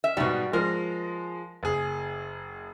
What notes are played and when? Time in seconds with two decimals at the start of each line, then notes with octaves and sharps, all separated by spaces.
0.04 E5
0.17 G#2 B2 G3 F#4
0.53 F3 G#3 A#4
1.63 F#1 G#4